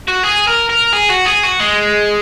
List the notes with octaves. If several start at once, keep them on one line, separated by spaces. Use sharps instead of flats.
F#4
G#4
A#4
A#4
G#4
F#4
G#4
F#4
G#3